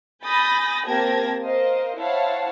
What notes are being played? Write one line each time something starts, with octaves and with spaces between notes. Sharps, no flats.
G#5 B5 D#6 G6 A6 A#6
A#3 C4 G4 A5 G#6 A#6
A#4 C5 D#5 F5
E4 C5 C#5 F5 F#5 A5